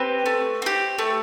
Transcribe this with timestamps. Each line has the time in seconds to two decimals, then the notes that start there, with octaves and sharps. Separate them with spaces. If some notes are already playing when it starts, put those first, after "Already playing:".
Already playing: C4 G4 B4
0.26 A3
0.62 C4 G4
0.98 A3